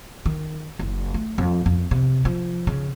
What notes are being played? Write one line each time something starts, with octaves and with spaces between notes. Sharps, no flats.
D#3
F#1
A3
F2
F2
C3
F3
C#3